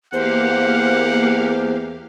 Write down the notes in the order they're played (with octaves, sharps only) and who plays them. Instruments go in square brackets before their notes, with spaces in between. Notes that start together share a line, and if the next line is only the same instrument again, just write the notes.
[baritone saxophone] E2 [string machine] A#3 G4 F5 [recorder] C5 [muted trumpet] F#5